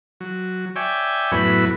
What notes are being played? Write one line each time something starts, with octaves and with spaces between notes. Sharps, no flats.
F#3
C#5 D5 E5 G5 G#5
F#2 A2 F#3 B3 E4 B4